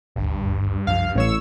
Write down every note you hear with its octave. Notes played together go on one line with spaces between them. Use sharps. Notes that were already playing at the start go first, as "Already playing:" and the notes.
D#1 G#1 D2 G2
C2 F#2 F3 F5
A1 A2 C#5 E6